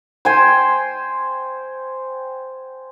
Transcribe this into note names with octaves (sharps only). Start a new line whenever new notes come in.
C5 G5 G#5